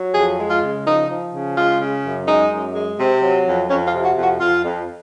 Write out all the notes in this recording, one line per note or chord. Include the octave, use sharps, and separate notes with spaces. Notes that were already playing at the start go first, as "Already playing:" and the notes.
Already playing: F#3
F2 G#4
G#3
F4
C#3
F3 D#4
F3
C#3
G#3 F4
C#3
F#2
G#3 D#4
F#2
G#3
C3 C4
F#3
F2
F2 C#4
F4
C3
F#4
F2
F#4
F2 F4
F2